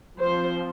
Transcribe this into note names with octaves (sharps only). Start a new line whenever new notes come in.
F3 C4 C5